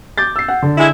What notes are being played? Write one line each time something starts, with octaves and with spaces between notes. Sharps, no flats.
D6 G6 A6
E6 C7
F#5
D3
G#3 E4